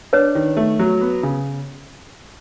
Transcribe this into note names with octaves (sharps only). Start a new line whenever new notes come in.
D4 B4 C#5
D#3
A3
F#3
B3
C#3